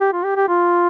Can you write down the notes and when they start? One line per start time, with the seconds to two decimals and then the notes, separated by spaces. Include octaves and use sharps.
0.01 G4
0.13 F4
0.24 G4
0.36 G4
0.48 F4